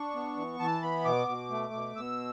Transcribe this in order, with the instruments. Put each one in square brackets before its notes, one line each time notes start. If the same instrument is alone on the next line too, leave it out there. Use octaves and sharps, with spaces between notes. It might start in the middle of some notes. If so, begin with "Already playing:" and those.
Already playing: [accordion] D4 C#6
B3
E3
E3 A5
B3 B5
B2 D6
B2
A3
B2
B2 E6